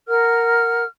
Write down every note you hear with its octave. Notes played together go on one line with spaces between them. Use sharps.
A#4 F#5 F6